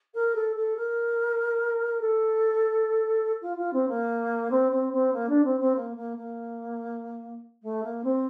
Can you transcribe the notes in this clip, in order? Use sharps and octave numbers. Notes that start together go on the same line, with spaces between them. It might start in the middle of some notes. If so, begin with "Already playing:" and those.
A#4
A4
A4
A#4
A4
F4
F4
C4
A#3
C4
C4
C4
A#3
D4
C4
C4
A#3
A#3
A#3
A3
A#3
C4